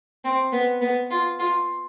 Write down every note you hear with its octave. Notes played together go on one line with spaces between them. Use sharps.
C4
B3
B3
F4
F4